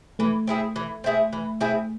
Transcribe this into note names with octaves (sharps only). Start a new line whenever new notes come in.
E3 A3
C4 E4 G#4
E3
C4 E4 G#4
E3
C4 E4 G#4